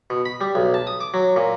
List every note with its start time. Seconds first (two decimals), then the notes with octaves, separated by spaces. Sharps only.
0.10 B2
0.25 B5
0.41 G3
0.55 B1
0.74 A5
0.87 D#6
1.00 D6
1.14 F#3
1.36 A#2